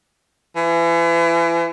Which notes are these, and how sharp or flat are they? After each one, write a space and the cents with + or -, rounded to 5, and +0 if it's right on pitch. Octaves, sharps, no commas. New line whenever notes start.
E3 +35